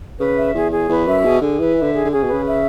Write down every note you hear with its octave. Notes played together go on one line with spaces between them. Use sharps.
C#3 B4
E5
E2 G#4
G#4
E2 B4
F#2 E5
B2 G#4
D3 G#4
E3 B4
E5
D3
G#4
D3
C#3 G#4
B2
C#3 B4
E5